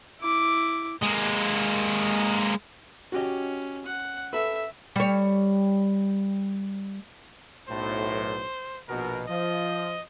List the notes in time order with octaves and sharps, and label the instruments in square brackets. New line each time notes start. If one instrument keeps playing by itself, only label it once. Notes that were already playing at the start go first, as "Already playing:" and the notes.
[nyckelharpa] E4 D6
[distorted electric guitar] G#3 A#3
[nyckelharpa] C#4 [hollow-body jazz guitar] F#4 G4 D#5
[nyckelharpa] F#5
[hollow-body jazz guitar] A4 B4 [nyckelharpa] E5
[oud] G3 C#5
[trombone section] B1 A2 [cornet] C5
[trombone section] A#1 B2 [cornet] A#4
[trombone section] F3 [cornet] D#5